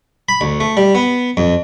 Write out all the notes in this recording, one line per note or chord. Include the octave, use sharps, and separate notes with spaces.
B5
D2
A3
G3
B3
F2